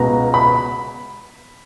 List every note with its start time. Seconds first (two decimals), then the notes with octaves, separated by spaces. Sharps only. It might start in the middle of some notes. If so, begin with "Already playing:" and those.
Already playing: C#2 B2 A#5
0.34 B5